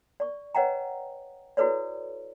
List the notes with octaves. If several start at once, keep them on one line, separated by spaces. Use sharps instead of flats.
D5 C#6
B4 C#5 D#5 F#5 G5 A#5
E4 F#4 A4 B4 C#5 D5